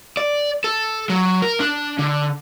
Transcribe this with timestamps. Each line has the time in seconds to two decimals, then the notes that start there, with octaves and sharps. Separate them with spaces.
0.17 D5
0.64 A4
1.10 F#3
1.42 A#4
1.60 D4
1.99 D3